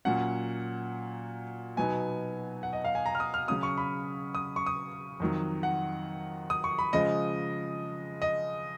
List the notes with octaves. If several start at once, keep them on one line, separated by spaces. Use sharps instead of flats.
A#2 F#3 C#4 F#5
B2 F#3 B3 D#4 G#5
F#5
D#5
F5
G#5
A#5
F6
D#6
F6
C#3 F#3 C#4 D#6
C#6
B5
D#6
C#6
D#6
F2 D#3 F#3
F#5
D#6
C#6
B5
C#3 F3 G#3 D#5
D#5